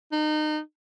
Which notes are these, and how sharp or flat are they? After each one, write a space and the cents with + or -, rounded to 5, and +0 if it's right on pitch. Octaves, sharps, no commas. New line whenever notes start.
D#4 -30